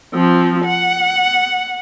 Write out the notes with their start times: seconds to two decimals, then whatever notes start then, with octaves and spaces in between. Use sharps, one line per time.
0.14 F3 C4
0.64 F#5